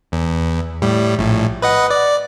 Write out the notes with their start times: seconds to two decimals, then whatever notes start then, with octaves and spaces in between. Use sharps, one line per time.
0.12 E2
0.82 A2 G3
1.19 A#1 A2
1.62 B4 D#5 F#5
1.91 D5